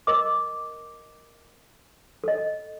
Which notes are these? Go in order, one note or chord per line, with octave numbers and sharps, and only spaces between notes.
A#4 D#5 D6
A4 D#5